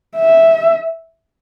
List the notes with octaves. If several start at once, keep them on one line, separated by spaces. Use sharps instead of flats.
E5